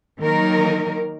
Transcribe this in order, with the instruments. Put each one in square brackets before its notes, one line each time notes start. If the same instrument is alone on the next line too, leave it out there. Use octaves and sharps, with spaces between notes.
[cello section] D#3 F#3 A#3 D#4 A#4